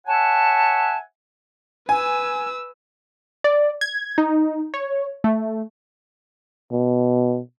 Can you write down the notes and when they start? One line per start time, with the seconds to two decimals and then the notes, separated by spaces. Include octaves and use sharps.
0.07 C#5 E5 F#5 G#5 A5
1.89 B4 G#5 E6
3.44 D5
3.81 G#6
4.18 D#4
4.74 C#5
5.24 A3
6.72 B2